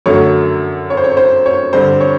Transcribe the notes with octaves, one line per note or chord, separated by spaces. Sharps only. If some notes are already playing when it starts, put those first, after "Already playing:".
F#2 D3 F#3 A3 C#5
C#5
C5
C#5
C5
C#5
G2 D3 G3 C5
C#5